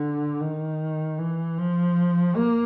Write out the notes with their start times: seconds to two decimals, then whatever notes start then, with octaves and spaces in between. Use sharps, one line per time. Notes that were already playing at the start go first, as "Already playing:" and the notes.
Already playing: D3
0.41 D#3
1.18 E3
1.58 F3
2.36 A#3